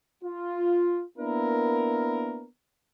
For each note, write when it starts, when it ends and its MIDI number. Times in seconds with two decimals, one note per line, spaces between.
0.24 1.02 65
1.19 2.45 58
1.19 2.45 59
1.19 2.45 62
1.19 2.45 64
1.19 2.45 70